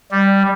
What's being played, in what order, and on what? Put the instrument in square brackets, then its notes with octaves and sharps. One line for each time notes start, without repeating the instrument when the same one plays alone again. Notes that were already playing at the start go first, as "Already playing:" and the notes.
[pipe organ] G3